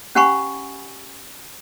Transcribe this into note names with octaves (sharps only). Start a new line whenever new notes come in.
C#4 G4 F#5 G#5 B5 C#6